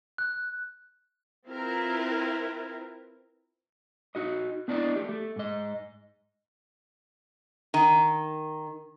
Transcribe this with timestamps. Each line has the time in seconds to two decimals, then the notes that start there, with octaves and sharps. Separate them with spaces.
0.18 F#6
1.46 C4 E4 F4 A#4 B4
4.15 D#4 F#4 D#5
4.68 B3 D4 E4 D5 D#5
4.96 A3 G4
5.09 A3
5.36 G#2 D#5
7.74 D#3